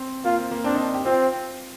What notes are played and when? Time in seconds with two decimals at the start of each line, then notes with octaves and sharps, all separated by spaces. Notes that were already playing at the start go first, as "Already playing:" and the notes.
Already playing: C4
0.24 A#3 F4
0.38 C4
0.51 A#3
0.64 C4 D4
0.74 D#4
0.94 G4
1.05 C4 F4